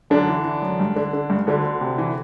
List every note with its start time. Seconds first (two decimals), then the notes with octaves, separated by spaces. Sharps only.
0.10 F#2 D3 D4
0.29 E3
0.44 E3
0.62 F#2
0.80 G2
0.96 D3
1.13 D3
1.30 G2
1.47 D2 D3 D4
1.64 D2
1.81 C3
1.98 E3